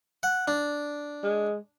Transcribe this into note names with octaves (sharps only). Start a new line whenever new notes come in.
F#5
D4
G#3